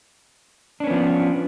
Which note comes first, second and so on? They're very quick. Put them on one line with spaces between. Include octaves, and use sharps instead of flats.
D4 C#4 B3 F3